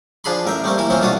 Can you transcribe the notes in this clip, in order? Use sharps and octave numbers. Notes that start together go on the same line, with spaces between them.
F3 D4 G#4 B5 C6
A1 A#4 E5 G5
G3 A3 A#3 C4
E3 A#3 E4
E3 F3 A#3 C4 C#4
C2 B2 A3 D4 F4 D#6